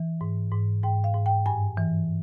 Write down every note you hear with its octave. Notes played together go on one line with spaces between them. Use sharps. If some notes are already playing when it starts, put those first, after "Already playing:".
Already playing: E3
G#2
G#2
G#2 G5
F5
G#2
G5
G2 G#5
E3